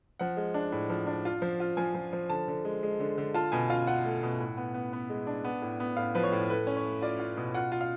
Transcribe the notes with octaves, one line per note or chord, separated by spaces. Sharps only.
F3 F#5
G#3
D4
A2
F3
D4
F4
F3
F4
F3 G#5
F3
F3
D3 A5
D3
G#3
G#3
D3
D3
F4 A5
B2 G#5
F4 F5
F4 F#5
A3
B2
A2
B3
B3
B3
G#3
D4
B3
A2
B3
A2 F5
F3 B4
C#5
A2
A3 B4
C#4
C#5
A3
F4 D5
F4
B2
F4 F#5
F4
F5